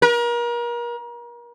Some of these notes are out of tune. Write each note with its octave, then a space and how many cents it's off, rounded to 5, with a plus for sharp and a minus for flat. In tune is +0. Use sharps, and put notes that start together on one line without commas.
A#4 +35